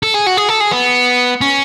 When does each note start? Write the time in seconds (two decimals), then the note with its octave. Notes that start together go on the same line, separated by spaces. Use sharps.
0.03 A4
0.14 G#4
0.27 F#4
0.37 G#4
0.49 A4
0.60 G#4
0.71 B3
1.41 C#4